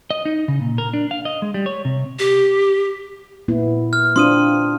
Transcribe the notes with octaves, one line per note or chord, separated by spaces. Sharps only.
D#5
D#4
C#3
A#2
A#4
D4
F5
D#5
G#3
G3
C#5
C3
G4
A#2 B3 E4
F6
C4 D4 F4 C6 D#6 D#7